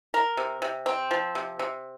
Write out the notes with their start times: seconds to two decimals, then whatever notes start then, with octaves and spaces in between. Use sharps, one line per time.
0.14 A#4
0.37 C3
0.62 C3
0.86 C4
1.11 F3
1.35 C3
1.59 C3